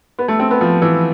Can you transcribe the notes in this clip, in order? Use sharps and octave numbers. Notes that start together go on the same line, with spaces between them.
B3
A3
C4
B3
F3
E3